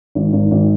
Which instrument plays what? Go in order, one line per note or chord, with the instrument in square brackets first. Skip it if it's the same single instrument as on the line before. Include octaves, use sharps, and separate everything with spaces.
[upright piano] G#1
G#1
G#1